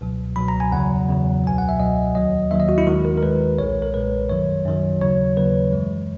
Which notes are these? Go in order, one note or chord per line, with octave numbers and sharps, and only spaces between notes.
C#2 B2 F#3
C#2 B2 F#3 B5
A#5
G#5
E2 C#3 F#3 F#5
E2 C#3 F#3
C#2 B2 F#3 G#5
F#5
E5
C#2 B2 F#3 D#5
D#2 D#3 F#3 D#5
D#2 D#3 F#3 E5
D#5
F#4
E4
D#2 D#3 G#3 F#4
A#4
A#4
D#2 D#3 G#3 B4
B1 A#2 G#3 C#5
A#4
B1 A#2 G#3 B4
F#2 D#3 F#3 C#5
F#2 D#3 F#3
D#2 C#3 F#3 C#5
D#2 C#3 F#3 B4
F#2 E3 G#3